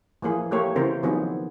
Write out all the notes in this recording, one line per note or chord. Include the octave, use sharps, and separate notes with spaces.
E3 F3 A#3 G#4
A3 A#3 G4 C#5
C#3 E3 C4 A#4 C5
D#3 F3 F#3 B3 C4 G#4